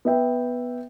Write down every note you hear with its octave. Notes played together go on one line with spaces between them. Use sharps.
B3 E5 G5